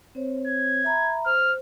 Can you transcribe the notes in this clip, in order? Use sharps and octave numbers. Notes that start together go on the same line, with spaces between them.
C4 C5 C#5
G#6
E5 A#5 B5
C5 F6